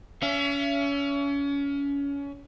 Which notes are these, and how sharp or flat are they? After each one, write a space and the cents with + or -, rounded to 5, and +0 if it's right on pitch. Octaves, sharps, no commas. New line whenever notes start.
C#4 +30 E5 +40